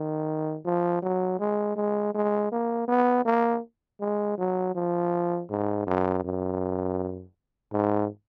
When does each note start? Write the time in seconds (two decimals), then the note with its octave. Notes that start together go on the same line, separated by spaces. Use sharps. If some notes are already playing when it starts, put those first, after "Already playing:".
Already playing: D#3
0.65 F3
1.02 F#3
1.39 G#3
1.76 G#3
2.14 G#3
2.52 A#3
2.88 B3
3.25 A#3
4.00 G#3
4.38 F#3
4.75 F3
5.50 G#2
5.87 F#2
6.24 F#2
7.73 G#2